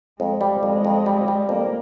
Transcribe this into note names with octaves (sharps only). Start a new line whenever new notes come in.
F2 G#3
G3
F2 G#3
F2
G3
G3
F2 A#3